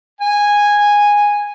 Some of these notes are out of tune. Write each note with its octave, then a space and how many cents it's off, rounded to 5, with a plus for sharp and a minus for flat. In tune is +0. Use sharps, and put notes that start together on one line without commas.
G#5 -10